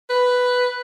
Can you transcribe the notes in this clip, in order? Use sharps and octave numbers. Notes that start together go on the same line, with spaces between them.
B4